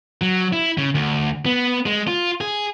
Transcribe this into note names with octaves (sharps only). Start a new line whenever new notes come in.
F#3
E4
C#3
D2
B3
G#3
F4
G#4